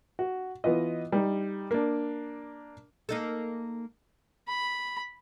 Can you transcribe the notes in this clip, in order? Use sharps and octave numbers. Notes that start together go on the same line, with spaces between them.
F#4
E3 B3 F4 D#5
G3 D#4
A#3 D4
A#3 D#4 A4
B5